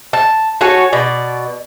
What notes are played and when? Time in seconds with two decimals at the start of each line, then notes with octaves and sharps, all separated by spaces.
0.13 A5
0.61 F#4 A4 C#5 G#5
0.92 B2 D5